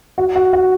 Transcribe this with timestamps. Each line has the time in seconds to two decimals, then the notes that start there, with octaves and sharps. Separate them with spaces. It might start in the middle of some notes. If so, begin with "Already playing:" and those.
0.18 F#4
0.36 F#4
0.53 F#4